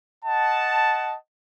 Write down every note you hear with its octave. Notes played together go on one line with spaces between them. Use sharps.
D#5 F#5 A5